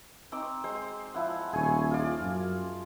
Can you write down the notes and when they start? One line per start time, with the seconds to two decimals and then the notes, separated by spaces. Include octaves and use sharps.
0.32 C4 D#4 D6
0.64 G#3 C5
1.14 F3 E4 F#5
1.53 D#1 G#4 G#5 C#6
1.91 F4 D5
2.21 F#2